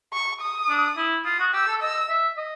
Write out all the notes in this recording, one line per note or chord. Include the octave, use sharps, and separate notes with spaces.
C#6
D#6
D4
E4
F4 D#6
F#4
G4 E6
A4
D#5 E6
E5
D#5